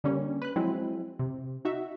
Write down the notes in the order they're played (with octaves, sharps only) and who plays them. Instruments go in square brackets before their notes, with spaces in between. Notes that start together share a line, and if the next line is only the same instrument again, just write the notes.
[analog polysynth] D3 G3 A#3 C#4
B4 F#6
F3 F#3 G#3 C4 E4
C3
D#4 F#4 E5